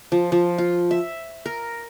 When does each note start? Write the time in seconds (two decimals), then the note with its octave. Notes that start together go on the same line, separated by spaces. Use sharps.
0.12 F3
0.32 F3
0.58 F4
0.91 E5
1.46 A#4